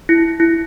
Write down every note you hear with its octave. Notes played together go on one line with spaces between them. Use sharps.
E4
E4